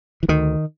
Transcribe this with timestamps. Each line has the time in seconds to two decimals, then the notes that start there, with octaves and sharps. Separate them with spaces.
0.23 E3
0.28 D2 D#3